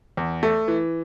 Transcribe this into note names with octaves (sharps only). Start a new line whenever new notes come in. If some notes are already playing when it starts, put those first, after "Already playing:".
E2
A3
E3